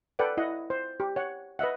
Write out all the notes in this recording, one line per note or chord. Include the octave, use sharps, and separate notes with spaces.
A4 B4 D5 F#5 G5
E4 D#5 F#5
C5
G4
C#5 F#5
B4 D#5 E5 F#5